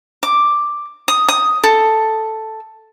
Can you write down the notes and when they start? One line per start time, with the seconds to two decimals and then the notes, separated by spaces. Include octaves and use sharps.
0.23 D6
1.08 D#6
1.28 D#6
1.64 A4